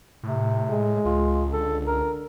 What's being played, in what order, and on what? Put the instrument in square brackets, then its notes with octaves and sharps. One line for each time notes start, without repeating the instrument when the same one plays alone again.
[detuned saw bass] A2 [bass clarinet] C3
[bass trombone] G#3
[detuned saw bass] C#2 [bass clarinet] F4
[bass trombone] D3 [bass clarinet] A4
[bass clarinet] A#4